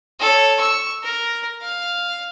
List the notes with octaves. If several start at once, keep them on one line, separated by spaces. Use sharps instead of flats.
A4 C#5
C#6 E6
A#4
F5